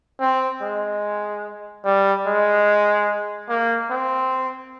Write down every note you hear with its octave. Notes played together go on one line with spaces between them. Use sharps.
C4
G#3
G3
G#3
A#3
C4